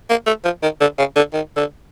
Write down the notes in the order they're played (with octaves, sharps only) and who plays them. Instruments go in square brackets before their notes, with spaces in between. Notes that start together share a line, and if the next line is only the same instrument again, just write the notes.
[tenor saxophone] A#3
A3
F3
D#3
D3
C#3
D3
D#3
D3